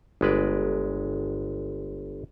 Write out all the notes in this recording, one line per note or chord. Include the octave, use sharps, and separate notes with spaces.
G1 G#3 B4 D5